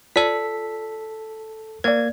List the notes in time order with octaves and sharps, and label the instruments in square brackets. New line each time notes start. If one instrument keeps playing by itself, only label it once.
[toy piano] F4 C5 D5 [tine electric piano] A4 B6
[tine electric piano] A#3 G#6 [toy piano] C5 D5